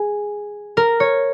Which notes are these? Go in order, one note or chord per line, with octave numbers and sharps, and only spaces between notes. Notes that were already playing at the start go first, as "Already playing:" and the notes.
Already playing: G#4
A#4
C#5